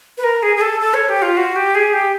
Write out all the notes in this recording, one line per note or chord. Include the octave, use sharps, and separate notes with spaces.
B4
A#4
G#4
G#4
A4
A4
C#5
G4
F4
F#4
G4
G#4
G4